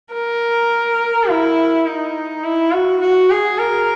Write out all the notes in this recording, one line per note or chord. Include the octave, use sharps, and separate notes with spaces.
A#4
E4
D#4
E4
F#4
F#4
G#4
A#4